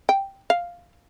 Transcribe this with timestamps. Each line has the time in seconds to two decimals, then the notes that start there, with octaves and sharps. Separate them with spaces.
0.09 G5
0.50 F5